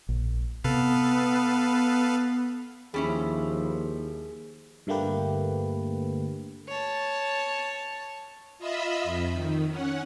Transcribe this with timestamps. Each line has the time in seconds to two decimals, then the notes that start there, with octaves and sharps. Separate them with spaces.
0.09 A#1
0.64 C3 B3 A4 B4 F5
2.94 D#2 F3 G3 C#4 E4 G#4
4.87 G2 D3 A3 A#3 G4 B4
6.68 C#5 A5
8.58 F4 D#5 E5 B5 E6
9.04 F2
9.32 D#3
9.69 C#4 F#5